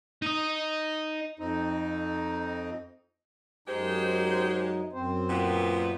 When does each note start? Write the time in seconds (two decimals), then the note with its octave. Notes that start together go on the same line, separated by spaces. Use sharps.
0.22 D#4 D#5
1.39 F2 C4 D#4
3.68 F#2 G#3 D#4 G4 C5
4.93 F#2 C4 C5
5.30 A#2 B3